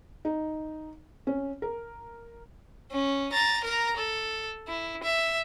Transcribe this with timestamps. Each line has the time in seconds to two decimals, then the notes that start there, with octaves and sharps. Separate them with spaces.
0.25 D#4
1.27 C#4
1.62 A#4
2.91 C#4
3.33 A#5 A6
3.64 A#4 A#5
3.97 A4
4.68 E4
5.03 E5